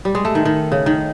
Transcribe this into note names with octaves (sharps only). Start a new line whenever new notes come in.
G3
G#3
A3
D#3
D#3
C#3
D#3